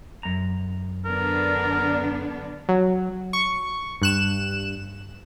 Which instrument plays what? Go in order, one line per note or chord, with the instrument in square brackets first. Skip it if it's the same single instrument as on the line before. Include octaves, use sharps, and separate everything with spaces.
[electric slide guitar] F#2 A#5
[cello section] D3 B3 D4 [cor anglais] A#4
[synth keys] F#3
C#6
G2 F#6 E7